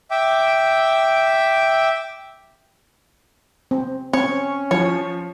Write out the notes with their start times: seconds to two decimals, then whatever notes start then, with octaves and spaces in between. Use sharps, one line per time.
0.11 E5 G5 D6
3.71 C4
4.13 C4 C#4 C#5
4.71 F3 C#5